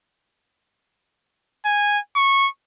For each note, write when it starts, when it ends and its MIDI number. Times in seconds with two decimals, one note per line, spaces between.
1.65 1.99 80
2.16 2.48 85